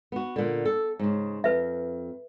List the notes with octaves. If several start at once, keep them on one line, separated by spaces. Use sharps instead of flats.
B3 F#4
A#2 D3
A4
G#2 C#3
F2 B4 E5